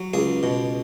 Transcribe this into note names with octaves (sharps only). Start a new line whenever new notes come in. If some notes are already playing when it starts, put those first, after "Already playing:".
Already playing: F#3
C#2 G#4
B2